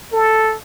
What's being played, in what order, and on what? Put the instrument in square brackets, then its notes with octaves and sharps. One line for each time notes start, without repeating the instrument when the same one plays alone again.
[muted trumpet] A4